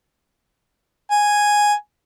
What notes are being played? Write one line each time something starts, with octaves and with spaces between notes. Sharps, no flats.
G#5